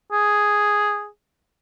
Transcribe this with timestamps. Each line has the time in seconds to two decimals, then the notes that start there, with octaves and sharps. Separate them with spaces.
0.12 G#4